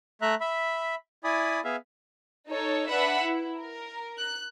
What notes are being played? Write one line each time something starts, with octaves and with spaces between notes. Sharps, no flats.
A3 E5 A#5 F#6
E5 B5
E4 D5 G#5 B5 D#6
B3 G#4 E5 F5
D#4 A4 C#5
D4 B4 E5 F#5 B5
E4
A#4
F#6